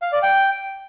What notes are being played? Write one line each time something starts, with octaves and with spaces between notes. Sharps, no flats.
F5
D5
G5